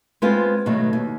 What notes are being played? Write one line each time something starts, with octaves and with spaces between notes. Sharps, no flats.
G#3 B3 C4 F4 B4 C5
B2 D#3 F#3 A3
D#2